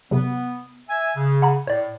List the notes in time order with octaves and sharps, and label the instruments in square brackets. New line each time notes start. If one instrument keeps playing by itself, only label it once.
[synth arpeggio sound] C3 F#3 [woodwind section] B3
[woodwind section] E5 G#5
C#3
[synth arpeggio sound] F#5 A#5 B5
[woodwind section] A2 [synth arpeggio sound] C#5 D5